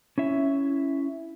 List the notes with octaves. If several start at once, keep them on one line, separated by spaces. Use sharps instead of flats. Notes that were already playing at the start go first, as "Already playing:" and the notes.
C#4 E4 E5